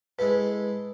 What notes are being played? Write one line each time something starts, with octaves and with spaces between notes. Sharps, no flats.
G#3 E4 A4 B4